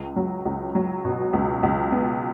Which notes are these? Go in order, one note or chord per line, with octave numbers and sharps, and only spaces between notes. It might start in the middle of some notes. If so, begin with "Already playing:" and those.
Already playing: C#2
F#3
C#2
F#3
B2
C#2
C#2
B3